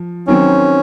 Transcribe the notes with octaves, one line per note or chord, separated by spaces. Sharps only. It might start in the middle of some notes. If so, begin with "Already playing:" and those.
Already playing: F3
D#3 F#3 C4 C#4